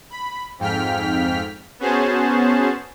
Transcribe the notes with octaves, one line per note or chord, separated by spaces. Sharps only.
B5
F2 G#2 G5 F6 B6
B3 C#4 F#4 G#4 C5 A5